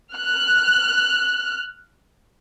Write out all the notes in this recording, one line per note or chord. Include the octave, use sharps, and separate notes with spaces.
F6 F#6